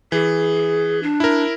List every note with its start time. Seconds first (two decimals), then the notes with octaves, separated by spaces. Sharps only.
0.12 E3 G#4
1.03 D4
1.20 E4 A#4